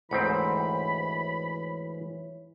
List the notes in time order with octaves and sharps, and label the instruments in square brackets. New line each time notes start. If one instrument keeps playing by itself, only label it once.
[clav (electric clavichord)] D2 G#2 C4 [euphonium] E3 [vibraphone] C#5 [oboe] B5